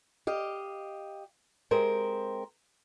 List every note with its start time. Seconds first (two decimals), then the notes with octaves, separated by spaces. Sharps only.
0.27 G4 D#5 F5
1.71 G#3 C4 G4 A#4 C5